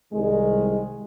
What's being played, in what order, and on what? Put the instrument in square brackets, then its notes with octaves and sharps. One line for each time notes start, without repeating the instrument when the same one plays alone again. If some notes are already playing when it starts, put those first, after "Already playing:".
[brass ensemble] C2 D#3 G#3